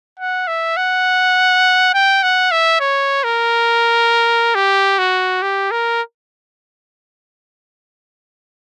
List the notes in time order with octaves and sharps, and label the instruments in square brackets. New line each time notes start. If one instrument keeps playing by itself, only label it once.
[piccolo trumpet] F#5
E5
F#5
G5
F#5
E5
C#5
A#4
G4
F#4
G4
A#4